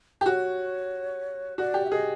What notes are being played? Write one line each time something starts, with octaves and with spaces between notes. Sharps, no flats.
G4
F#4 C#5
F#4 D5
G4
E5
G#4 D#5